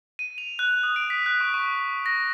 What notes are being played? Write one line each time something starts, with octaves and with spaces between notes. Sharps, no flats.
D#7
F7
F#6
D#6
D7
B6
F#6
C#6
C#6
A#6